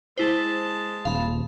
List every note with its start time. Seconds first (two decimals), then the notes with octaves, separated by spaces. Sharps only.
0.18 G#3 E4 C5 A5
1.05 D#1 F5 B5